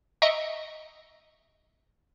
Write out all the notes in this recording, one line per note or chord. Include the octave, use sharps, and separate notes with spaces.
D#5 E5 A#5 C#6 C#7 D7